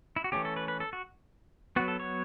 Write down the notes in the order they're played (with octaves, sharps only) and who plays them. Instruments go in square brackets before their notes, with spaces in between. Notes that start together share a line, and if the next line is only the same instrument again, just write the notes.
[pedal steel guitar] E4
F#4
E3 A3 C#4 G4
A4
B4
B4
A4
F#4
F#3 B3 F#4
A4
C#5